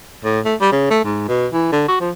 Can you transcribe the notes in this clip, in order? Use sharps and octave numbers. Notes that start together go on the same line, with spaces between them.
A2
A3
G3
C#3
A3
G#2
B2
E3
D3
F#4
F3